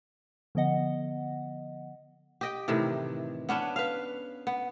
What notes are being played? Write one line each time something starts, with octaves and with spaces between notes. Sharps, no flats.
D3 F3 B3 D#5 F#5
G4 D#5 G5
A2 C3 D#3 E3
B3 C#4 D4 B4
B4 F5
B3